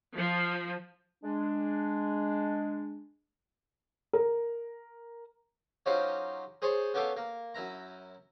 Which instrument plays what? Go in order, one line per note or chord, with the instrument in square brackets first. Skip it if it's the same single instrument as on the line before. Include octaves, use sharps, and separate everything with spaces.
[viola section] F3
[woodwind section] G#3 D4
[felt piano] A#4
[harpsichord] F#3 C#4 D#4 F4 G4 C5
G#4 C5 C#5 G#5 A5
B3 C#4 G4 A4 F5
A#3
F#2 E4 A#5